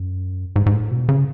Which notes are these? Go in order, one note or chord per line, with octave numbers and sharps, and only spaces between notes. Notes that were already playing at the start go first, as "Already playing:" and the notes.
Already playing: F#2
G#2
G#2
A2
B2
C#3